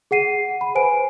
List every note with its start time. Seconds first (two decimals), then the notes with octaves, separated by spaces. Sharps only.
0.11 G#4 F#5 C7 D#7
0.61 B5
0.75 B4 C5 G#5 D7